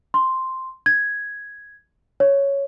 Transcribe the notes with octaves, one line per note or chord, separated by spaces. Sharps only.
C6
G#6
C#5